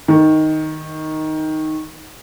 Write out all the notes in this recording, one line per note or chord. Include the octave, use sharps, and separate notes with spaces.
D#3